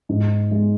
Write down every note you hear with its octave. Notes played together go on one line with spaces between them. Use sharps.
G#2
G#3